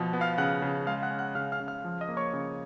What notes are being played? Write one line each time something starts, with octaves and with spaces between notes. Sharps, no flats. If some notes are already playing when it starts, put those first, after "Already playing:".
Already playing: B2 F3
B3
F5 F6
C#3 F#5 F#6
C#3
G#3 F5 F6
F#5 F#6
C#4
F#5 F#6
C#3 F5 F6
F5 F6
C#3
F5 F6
F3
D#5 D#6
A#3
C#5 C#6
C#3